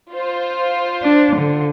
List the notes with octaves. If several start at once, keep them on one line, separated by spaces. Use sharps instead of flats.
F4 C5
D4
D3